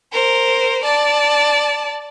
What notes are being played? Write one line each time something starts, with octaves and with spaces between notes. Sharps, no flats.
A#4 C5
D5 A5